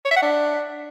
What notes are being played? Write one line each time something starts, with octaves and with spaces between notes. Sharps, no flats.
C#5
E5
F#5
D4